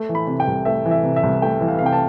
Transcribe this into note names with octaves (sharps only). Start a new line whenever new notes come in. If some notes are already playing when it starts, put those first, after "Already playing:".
Already playing: A3
E3
B5
C3
G5
C2
A3 E5
E3
E5
C3
E5
C2
A3 G5
E3
F5
C3 F5
G5
A5